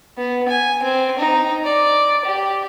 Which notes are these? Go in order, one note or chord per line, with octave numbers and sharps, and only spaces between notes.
B3
G#5
C4
D#4
D5
G4